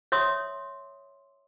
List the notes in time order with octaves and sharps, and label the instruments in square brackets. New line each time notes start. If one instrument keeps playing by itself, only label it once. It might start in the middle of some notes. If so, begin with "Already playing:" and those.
[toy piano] C#5 E5 C6 D#6